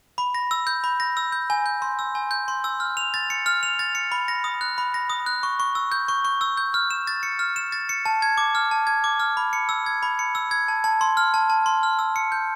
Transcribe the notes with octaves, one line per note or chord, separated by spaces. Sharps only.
B5
A#6
E6
G6
B5
A#6
E6
G6
G#5
G6
C6
E6
G#5
G6
C6
E6
F6
F7
A6
C#7
F6
F7
A6
C#7
B5
A#6
D#6
F#6
B5
A#6
D#6
F#6
C#6
C#6
E6
G6
C#6
C#6
E6
G6
F6
E7
A6
C#7
F6
E7
A6
C#7
A5
G#6
D6
F6
A5
G#6
D6
F6
B5
C#7
E6
G#6
B5
C#7
E6
G#6
A5
A5
C6
F6
A5
A5
C6
F6
E6
C#7
G6